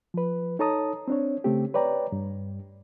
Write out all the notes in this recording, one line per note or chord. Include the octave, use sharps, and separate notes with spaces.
F3 B4
D#4 A4 C#5 A5 A#5 D#6
C4 D4 C#5
C#3 A3 C4 G4
B4 C#5 D5 G5 A#5
G2